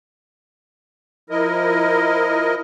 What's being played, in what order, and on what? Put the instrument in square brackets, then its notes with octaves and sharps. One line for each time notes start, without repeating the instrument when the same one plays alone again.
[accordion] F3 E4 A#4 D#5